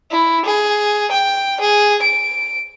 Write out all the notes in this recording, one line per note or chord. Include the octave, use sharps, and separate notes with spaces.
E4
G#4
G5
G#4
D7